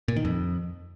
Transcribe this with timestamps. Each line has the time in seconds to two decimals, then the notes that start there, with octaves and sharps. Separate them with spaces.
0.08 A#2
0.16 D#3
0.25 F2